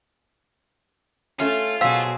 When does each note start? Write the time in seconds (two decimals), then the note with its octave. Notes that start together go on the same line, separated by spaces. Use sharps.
1.40 A3 C#4 F4
1.81 B2 F#3 G#4 C5 F5 A5 E6